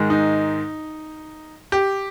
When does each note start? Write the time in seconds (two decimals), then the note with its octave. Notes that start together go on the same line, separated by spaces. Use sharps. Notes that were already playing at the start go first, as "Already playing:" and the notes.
Already playing: G#2 D#3 G#3
0.10 D#4
1.72 G4